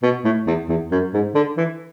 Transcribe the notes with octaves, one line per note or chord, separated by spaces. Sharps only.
B2
A2
E2
E2
F#2
G#2
D3
E3